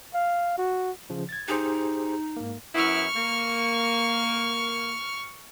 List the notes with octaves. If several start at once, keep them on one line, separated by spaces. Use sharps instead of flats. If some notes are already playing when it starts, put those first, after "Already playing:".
F5
F#4
C#3 F3
G#6 A6
D#4 G4 G#4 C5
G#2 A#3
F#2 B3 E4 C#6 F6
A#3